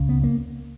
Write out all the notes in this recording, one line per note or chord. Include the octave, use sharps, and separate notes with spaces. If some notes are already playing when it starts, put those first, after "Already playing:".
Already playing: C#2 C#3
B3
A#3